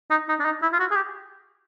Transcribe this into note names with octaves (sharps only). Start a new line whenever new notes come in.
D#4
D#4
D4
D#4
E4
F4
F#4
G#4
G4